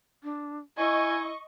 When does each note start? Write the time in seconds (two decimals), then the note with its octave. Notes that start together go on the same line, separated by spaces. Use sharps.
0.23 D4
0.78 E4 D#5 G#5 C#6